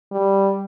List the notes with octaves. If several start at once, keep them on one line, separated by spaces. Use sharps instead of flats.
G3